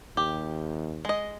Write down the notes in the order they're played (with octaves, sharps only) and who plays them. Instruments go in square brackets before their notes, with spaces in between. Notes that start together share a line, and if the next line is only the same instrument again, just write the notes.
[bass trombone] D#2 [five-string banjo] G4
[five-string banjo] G#3 D#5